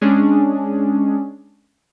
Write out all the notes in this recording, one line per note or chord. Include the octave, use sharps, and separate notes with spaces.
G#3 C#4 D4 G#4